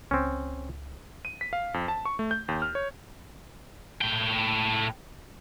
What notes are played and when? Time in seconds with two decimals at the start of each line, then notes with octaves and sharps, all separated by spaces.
0.11 C#2 C4 C#4
1.25 D#7
1.41 B6
1.53 F5
1.74 F2
1.88 A5
2.05 C#6
2.19 A3
2.31 G6
2.48 D#2
2.62 F6
2.75 C#5
4.01 A2 G5